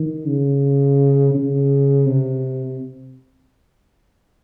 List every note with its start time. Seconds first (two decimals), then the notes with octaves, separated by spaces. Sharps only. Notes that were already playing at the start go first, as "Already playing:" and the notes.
Already playing: D#3
0.27 C#3
1.34 C#3
2.07 C3